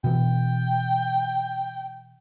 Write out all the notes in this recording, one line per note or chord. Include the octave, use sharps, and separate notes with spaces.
B2 E3 G5